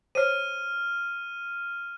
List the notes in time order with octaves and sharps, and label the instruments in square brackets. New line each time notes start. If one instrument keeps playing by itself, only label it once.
[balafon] C5 C#5 [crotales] F6 D#7